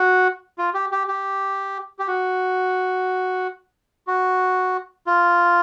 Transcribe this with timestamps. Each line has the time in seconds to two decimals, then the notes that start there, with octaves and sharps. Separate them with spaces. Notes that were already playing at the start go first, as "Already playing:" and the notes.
Already playing: F#4
0.58 F4
0.74 G4
0.92 G4
1.08 G4
1.99 G4
2.08 F#4
4.07 F#4
5.07 F4